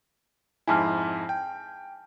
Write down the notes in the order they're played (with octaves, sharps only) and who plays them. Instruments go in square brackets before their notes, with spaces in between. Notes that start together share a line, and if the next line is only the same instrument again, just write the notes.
[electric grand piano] F2 G#2 E4 [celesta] G#5 A5 F6
[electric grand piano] G5